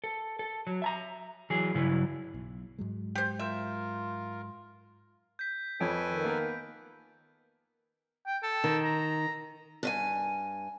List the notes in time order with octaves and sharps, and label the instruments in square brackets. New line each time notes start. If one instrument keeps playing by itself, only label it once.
[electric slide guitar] A4
A4
F#3
E5 A5 A#5
E3 F#3 G#4
G2 C#3 F#3 E4
[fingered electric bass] B1
G#2 F#3 G#3
[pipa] G4 C5
[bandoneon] F4 A#4 [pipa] E5
[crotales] G6 B6
[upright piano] F2 F3 C#5 [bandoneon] A4 B4 G#5 [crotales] D7
[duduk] D#3
[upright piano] A#3 B3 A#4
[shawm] G5
A4
[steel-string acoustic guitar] D#3
[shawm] A#5
[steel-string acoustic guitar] G2 B4 G#5